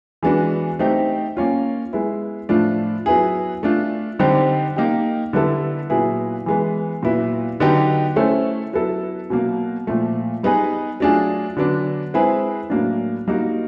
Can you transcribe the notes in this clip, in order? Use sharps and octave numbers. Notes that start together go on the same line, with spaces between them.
E3 G#3 B3 D4 F#4
A3 C4 D#4 G4
A#3 C#4 F4
G#3 B3 E4
A2 F3 A3 D4 F4
F#3 B3 E4 G#4
A3 D4 F4
D3 G3 C4 D#4 G4
A#3 D#4 G4
D3 G3 B3 E4 A4
A#2 F#3 B3 E4 G#4
E3 G#3 B3
A#2 F#3 B3 E4
D3 F#3 B3 D#4 G4
A3 C#4 E4 A4 C5
F#3 B3 E4 A4
B2 F#3 A#3
A#2 F3 A3
G3 B3 D#4 G#4 B4
F#3 A3 D4 F4 G#4
D3 F#3 B3 D4
G#3 C4 E4 G#4 B4
A2 F#3 A#3 D4
G3 A#3 D#4 F#4